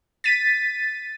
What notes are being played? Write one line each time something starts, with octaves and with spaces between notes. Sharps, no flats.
A6 B6 D#7